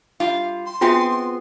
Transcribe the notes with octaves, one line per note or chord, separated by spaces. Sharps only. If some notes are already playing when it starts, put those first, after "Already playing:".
G3 F4 F5
C6
B3 C4 F4 F#4 G#4 E5